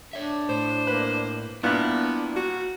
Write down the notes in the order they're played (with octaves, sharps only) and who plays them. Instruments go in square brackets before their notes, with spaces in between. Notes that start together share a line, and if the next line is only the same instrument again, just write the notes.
[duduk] D4 [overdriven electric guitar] C#5 E5
[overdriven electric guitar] A2 [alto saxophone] C5
[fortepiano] A#3 B4
[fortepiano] G2 A#2 F#6 [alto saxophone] B3 [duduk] D4 [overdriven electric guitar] E4
[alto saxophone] F#4